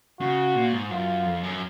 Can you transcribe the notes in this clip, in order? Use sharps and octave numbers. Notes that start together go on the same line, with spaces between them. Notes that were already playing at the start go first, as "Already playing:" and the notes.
C#3 F#4
A#2
G#2
F#2 F4
F2
F#2